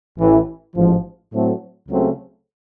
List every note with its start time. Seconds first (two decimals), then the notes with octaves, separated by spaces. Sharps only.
0.18 A1 A2 E3
0.75 A1 G#2 F3
1.32 A2 F#3 A3 C4
1.89 C#2 C#3 F#3 A3 C4